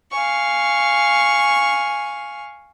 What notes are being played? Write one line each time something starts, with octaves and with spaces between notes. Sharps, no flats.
F5 G#5 C#6